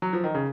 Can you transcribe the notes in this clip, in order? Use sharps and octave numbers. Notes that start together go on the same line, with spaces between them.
F#3
F3
D#3
C#3